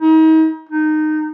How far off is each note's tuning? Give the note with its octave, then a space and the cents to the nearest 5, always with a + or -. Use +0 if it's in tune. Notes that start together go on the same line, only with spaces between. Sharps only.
D#4 +35
D#4 -15